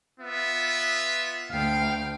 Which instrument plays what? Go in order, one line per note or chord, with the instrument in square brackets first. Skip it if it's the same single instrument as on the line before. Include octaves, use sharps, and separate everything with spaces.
[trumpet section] B3 F4 E5
[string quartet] D2 G5 [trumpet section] F5